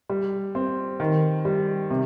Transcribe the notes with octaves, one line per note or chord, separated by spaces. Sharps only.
G3
C4
D#3
G3
C3